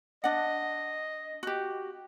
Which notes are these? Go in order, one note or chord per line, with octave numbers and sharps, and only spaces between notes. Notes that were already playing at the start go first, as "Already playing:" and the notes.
D4 D#5 F#5
F#4 G4